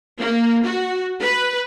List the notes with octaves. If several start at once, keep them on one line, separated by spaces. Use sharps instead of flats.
A#3
F#4
B4